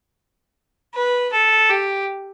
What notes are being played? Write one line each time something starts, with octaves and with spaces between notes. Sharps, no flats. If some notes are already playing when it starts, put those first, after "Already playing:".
B4
A4
G4